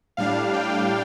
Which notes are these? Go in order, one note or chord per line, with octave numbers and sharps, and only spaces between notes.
A2 G3 D4 F5
G5